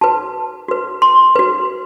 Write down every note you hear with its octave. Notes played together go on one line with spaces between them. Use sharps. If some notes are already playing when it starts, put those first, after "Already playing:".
F#4 B4 A5
F#4 B4
C6
F#4 B4